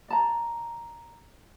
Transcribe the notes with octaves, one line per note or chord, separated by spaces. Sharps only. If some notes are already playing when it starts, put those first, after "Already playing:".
D5 A5 A#5